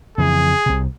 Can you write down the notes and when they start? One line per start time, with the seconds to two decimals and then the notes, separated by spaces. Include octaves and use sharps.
0.18 F2 C#3 E3 G#4
0.66 C2 C3